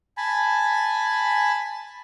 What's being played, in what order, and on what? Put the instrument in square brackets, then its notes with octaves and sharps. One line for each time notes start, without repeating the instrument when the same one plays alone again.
[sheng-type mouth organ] G#5 A5 B5